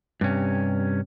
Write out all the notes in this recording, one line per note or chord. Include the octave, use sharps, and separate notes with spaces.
G2 C3 C#4